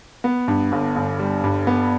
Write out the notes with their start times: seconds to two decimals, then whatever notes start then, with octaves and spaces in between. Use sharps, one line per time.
0.24 B3
0.48 G2
0.72 G1
0.96 G1
1.19 G3
1.44 G2
1.67 B3